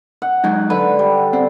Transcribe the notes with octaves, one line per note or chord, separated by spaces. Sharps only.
F#5
F#3 G#3 D#4
D3 B4
G3
C4